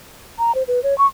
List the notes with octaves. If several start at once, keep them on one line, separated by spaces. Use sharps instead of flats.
A#5
C5
B4
C#5
C#6